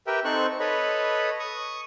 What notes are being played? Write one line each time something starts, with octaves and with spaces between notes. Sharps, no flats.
G4 A#4 B4 E5 G5
C4 D#4 A4 C5 C#6 F#6
A4 B4 C#5 D#5 B5
C#6 D#6